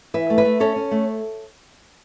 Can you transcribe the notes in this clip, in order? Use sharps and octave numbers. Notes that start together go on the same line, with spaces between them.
E3 B4 E5
A3
B4 E5
A3
C#4 A4 C#5
C#4
A3